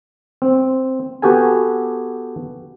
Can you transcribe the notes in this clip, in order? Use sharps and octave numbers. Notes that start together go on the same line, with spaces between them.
C4
B3 F#4 G4 A4 G#5